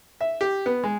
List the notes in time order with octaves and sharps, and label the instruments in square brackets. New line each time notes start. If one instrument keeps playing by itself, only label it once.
[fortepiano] E5
G4
B3
G#3